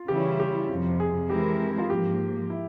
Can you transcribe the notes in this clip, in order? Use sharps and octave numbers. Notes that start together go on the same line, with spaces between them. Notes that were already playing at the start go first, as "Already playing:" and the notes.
Already playing: F4
C#3 E3 G3 C#4 E4 G4
G4
F2 C3 F3
G#4
E3 G#3 C4 E4 G4 A#4
F4
G#2 F3 A#3 G4
E4